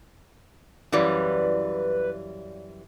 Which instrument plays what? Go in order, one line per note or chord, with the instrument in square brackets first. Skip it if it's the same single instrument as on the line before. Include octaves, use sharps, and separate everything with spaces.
[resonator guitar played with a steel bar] F#2 E3 G3 [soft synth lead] B4 [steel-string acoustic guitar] C#5 D5 F5